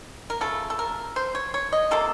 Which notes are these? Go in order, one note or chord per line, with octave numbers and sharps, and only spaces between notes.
A#4
C#3 F3 A3 A4
A4
A#4
C5
C#5
C#5
D#5
C3 F3 A#3 F4 A4